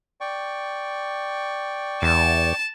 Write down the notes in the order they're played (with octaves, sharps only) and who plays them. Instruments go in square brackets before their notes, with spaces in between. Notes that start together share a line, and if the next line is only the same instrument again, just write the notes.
[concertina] D5 G5 C#6
[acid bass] E2 [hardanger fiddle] A5